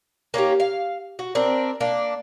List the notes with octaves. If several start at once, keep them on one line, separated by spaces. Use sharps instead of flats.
A#3 C#4 D#4 G4
F5
F#4
C4 D4 A#4
A#3 D4